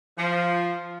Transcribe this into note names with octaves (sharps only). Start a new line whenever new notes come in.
F3